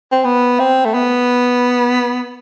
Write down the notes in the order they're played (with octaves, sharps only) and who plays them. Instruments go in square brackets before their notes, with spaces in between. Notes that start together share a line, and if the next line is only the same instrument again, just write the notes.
[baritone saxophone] C4
B3
C4
A3
B3